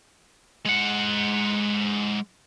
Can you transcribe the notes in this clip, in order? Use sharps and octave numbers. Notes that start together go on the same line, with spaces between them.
G#3 F#5